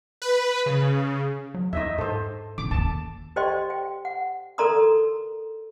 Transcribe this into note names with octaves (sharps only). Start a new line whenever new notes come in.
B4
C#3
F#3
E2 D#4 D#5 E5
G#2 A4 C5
G#1 C#4 D6
F#1 D#2 A5
G4 C5 D5 D#5 G5 C6
G5
F#5
A4 A#4 D5 A#5 C6 D#6